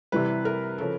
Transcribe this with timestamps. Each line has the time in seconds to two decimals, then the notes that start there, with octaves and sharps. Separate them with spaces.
0.12 C3 E3 G3 B4
0.45 A#4
0.78 C#3 F3 A4